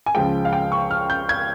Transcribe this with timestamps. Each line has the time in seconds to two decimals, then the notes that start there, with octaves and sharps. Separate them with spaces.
0.06 G#5
0.14 C#2 C#3 F3 G#3 G5
0.45 F5
0.53 G5
0.72 C#6
0.91 F6
1.10 G6
1.29 G#6